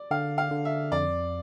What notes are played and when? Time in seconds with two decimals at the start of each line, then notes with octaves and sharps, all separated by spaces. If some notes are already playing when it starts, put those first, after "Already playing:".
Already playing: D5
0.11 D3 F5
0.38 F5
0.51 D3
0.65 E5
0.92 F2 D5